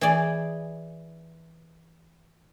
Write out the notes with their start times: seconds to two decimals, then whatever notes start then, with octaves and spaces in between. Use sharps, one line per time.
0.01 E3 G#4 D5